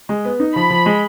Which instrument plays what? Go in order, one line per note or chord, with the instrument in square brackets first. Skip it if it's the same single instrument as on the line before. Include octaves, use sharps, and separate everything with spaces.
[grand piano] G#3
B3
D#4
[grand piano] F3 [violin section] B5
[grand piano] F3
G#3